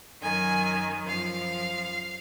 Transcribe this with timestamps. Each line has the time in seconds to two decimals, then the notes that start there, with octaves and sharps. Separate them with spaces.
0.22 F#2 D#3 F#3 G#5
1.06 F#2 F3 F5